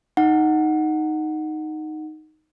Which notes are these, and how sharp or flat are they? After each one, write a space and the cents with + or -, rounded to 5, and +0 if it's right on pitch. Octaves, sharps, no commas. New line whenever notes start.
D#4 +0 F#5 +0